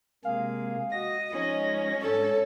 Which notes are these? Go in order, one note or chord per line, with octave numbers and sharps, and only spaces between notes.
C3 G#3 A#3 G#4 F5
F#4 D#5 A#6
F3 G#3 C#4 D#4
G#2 D4 A4 C#5